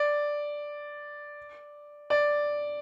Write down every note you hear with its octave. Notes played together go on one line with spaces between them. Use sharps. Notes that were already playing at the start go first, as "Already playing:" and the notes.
Already playing: D5
D5